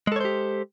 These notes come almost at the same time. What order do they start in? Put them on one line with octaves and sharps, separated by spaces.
G#3 A4 C#5 C5 G4